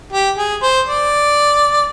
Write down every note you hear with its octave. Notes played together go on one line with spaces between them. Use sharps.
G4
G#4
C5
D5